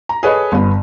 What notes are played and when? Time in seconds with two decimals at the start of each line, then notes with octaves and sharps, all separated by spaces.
0.09 A#5
0.23 G#4 A4 B4 C#5 D#5
0.52 G1 B3